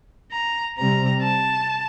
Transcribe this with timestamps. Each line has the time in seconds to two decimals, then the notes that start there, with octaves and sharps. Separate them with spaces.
0.32 A#5
0.77 C3 G3 C4 A#5
1.22 A5